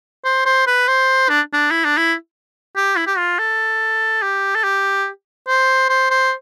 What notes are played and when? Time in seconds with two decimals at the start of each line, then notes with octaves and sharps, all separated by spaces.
0.25 C5
0.46 C5
0.67 B4
0.88 C5
1.29 D4
1.53 D4
1.71 E4
1.85 D4
1.98 E4
2.76 G4
2.96 E4
3.07 G4
3.18 F4
3.39 A4
4.22 G4
4.55 A4
4.64 G4
5.48 C5
5.89 C5
6.11 C5